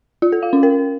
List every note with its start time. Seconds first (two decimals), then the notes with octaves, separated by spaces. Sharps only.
0.22 F4
0.32 A4
0.43 F5
0.53 C#4
0.63 A#4